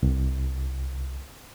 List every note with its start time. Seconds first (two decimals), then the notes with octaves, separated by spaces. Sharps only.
0.03 C2